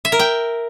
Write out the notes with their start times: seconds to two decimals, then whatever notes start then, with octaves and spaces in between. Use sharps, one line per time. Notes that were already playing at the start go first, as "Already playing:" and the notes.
0.05 E5
0.12 A#4
0.19 G5